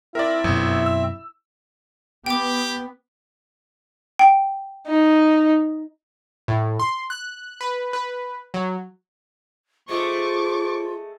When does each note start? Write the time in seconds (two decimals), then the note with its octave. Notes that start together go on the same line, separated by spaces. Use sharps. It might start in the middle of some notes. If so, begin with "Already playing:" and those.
0.15 C4 E4 A#4 D5 E5
0.44 G1 F#2 B2
0.86 E6
2.26 B3 G4 G5 D6
4.19 G5
4.87 D#4
6.48 A2
6.80 C6
7.10 F#6
7.61 B4
7.93 B4
8.54 F#3
9.89 G#3 A3 F4 C5 C#6 D6